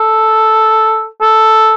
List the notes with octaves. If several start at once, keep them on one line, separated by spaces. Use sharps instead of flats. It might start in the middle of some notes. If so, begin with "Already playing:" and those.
Already playing: A4
A4